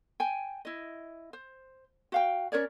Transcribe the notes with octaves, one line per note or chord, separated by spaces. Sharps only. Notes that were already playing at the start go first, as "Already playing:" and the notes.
G5 G#5
E4 D#5
C5
F#4 F5 G5
C#4 A#4 C#5 D5